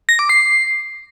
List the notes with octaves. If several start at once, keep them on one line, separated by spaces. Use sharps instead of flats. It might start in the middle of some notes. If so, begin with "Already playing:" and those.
A#6
D6
C7